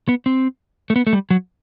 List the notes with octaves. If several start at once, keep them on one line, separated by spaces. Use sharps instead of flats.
B3
C4
A3
B3
A3
G3
F#3